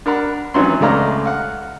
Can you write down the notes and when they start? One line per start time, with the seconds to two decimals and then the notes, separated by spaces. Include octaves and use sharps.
0.06 D4 A#4 F#5 B5
0.54 G#1 E3 F#3 C#4 C6
0.80 C#2 G#3 A3 D5 F5 A#5
1.25 F5 F#5